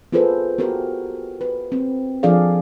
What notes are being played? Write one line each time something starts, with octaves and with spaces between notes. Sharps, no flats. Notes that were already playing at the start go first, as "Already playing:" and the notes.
B3 F4 G#4 A4 B4 C5
B3 F#4 G4 A#4
B4
C4
F3 D4 G#4 A4 D5 F5